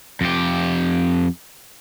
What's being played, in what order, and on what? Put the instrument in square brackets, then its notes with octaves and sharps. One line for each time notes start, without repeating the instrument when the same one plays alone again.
[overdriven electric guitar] F2 G4